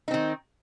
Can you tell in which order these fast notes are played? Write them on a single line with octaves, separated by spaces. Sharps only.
D#4 C4 D#3